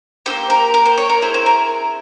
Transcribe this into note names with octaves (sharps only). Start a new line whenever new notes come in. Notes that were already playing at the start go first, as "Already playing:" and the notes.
A#3 E4 G4 C5
A#4
A#4
C5
C#5
A#4
C4 E4 G#4 C5
C5
A#4